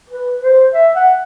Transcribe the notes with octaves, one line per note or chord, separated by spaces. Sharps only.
B4
C5
E5
F#5